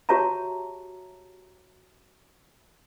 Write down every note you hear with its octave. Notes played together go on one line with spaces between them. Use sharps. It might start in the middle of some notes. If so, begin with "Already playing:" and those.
F#4 G4 C#5 E5 A5 A#5